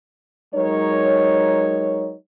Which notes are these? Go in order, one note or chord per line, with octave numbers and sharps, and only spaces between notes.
F#3 G#3 D#4 A#4 C#5